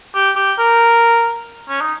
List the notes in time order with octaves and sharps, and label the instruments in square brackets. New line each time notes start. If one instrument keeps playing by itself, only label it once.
[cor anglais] G4
G4
A#4
C#4
D#4